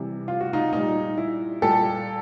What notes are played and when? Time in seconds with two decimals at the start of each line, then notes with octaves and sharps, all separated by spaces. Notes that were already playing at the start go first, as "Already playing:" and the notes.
Already playing: C3 E3 G3
0.28 F4
0.41 F#4
0.53 D#4 F4
0.72 A#2 G3 D#4
1.18 E4
1.62 A#2 G3 G4 A4